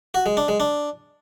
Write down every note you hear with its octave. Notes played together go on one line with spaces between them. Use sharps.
F#4
G#3
D4
G#3
D4